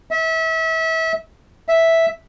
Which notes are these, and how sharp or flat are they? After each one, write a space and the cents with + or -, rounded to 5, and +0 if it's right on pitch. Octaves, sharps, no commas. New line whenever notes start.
E5 -30
E5 -5